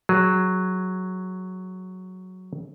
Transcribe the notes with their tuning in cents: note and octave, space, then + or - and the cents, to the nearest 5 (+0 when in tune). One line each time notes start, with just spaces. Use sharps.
F#3 +0 G#4 +0